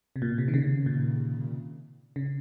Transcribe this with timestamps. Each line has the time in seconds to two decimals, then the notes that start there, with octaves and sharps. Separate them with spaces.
0.16 C3
0.22 A#2
0.38 C3
0.48 D#3
0.54 C#3
0.86 A#2
2.16 C#3